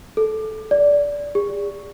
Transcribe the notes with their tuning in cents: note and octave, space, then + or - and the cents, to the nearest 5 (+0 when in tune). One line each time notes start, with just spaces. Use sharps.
A4 -15
D5 -15
G#4 -45